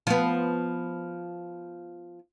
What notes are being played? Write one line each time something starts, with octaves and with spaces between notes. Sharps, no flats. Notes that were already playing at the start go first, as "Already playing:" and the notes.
F3 B3